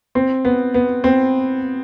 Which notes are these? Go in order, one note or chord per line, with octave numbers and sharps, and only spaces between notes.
C4
B3
B3
C4